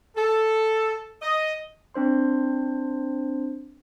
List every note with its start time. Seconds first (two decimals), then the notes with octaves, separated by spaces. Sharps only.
0.17 A4
1.22 D#5
1.94 C4 D4 C5 C6